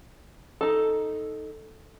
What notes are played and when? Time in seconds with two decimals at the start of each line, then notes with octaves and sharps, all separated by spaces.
0.61 D#4 A4